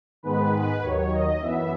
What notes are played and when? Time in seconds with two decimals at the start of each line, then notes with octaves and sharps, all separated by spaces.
0.23 G#2 D#3 G#3 B3 B4
0.81 D#2 D#3 F#3 C#5
1.11 D#5
1.40 F#2 E3 B3 E5